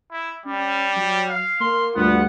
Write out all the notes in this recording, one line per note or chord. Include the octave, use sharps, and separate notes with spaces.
E4
G3 C#4
F#3
F5
A#3 C6
D2 G2 B3 F4 F#5